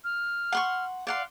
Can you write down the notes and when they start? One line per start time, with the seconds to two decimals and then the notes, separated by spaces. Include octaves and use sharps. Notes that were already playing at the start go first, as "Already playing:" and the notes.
0.04 F6
0.52 F#5 C6 C#6
1.07 D5 F5 F#5 C6